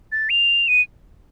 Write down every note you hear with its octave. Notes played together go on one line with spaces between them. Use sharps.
A6
F7
D#7